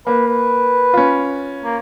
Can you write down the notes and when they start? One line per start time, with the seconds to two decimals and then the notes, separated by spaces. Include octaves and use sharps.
0.07 A#3 B4
0.27 B4
0.94 C#4 F4
1.64 A#3